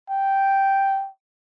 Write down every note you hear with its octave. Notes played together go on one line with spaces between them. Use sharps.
G5